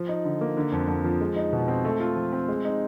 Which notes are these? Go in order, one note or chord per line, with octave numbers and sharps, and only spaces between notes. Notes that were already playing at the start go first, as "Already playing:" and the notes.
Already playing: F3
D#4
D3
A#3
D3
F2
F2
F3
G#3
D#4
B2
C4
A3
F4
F3
C4
G#3
D#4